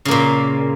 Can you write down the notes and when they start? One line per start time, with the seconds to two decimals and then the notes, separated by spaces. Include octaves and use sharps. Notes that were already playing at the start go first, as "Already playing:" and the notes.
0.05 C#3
0.08 A#3
0.11 A#2